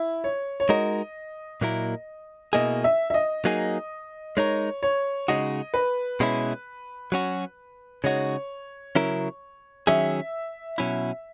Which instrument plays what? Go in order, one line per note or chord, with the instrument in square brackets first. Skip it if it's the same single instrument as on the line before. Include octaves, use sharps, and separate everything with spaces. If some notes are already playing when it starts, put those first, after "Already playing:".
Already playing: [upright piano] E4
C#5
C#5
[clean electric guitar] G#3 D#4 F#4 A#4 [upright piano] D#5
[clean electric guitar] A#2 F#3 A#3 E4 A#4
[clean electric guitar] B2 A#3 E4 G#4 [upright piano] D#5
[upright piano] E5
E5
D#5
[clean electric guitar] F#3 A#3 D#4 G#4
[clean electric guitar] G#3 D#4 A#4 [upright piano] C#5
[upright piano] C#5
[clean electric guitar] C#3 G#3 D#4 F#4 [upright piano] D#5
[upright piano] B4
[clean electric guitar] B2 G#3 C#4 E4
F#3 C#4 F#4
[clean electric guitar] C#3 G#3 D#4 F#4 [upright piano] C#5
[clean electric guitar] C#3 F#3 C#4 E4 A#4
[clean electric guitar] D#3 F#3 C#4 G#4 [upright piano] E5
[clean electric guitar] B2 F#3 C#4 E4